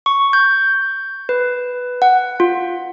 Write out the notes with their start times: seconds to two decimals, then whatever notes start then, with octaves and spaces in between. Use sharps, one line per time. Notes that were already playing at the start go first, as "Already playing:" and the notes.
0.06 C#6
0.33 G6
1.29 B4
2.02 F#5
2.40 F4